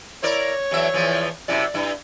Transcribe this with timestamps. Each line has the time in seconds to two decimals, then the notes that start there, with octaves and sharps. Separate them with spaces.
0.23 E4 A#4 C#5 D5
0.71 E2 F#3 E5
0.94 E2 E3 F3
1.48 F#2 C3 E4 D5
1.74 G2 E4